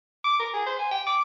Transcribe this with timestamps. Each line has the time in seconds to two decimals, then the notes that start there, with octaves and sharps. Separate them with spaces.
0.24 D6
0.39 A#4
0.54 G#4
0.67 C5
0.79 G#5
0.91 G5
1.07 D6